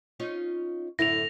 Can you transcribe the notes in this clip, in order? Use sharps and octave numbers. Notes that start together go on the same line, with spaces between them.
C#4 D#4 F4
F#2 A2 D3 E4 A#6 F7